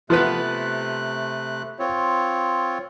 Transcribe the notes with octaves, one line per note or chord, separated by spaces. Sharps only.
C3 F3 A3 B3 B4 F#6
C4 F4 C#5